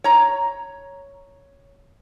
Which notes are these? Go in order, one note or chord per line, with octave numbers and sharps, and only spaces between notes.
C#5 A#5